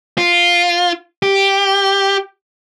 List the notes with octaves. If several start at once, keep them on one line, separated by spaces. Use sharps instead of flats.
F4
G4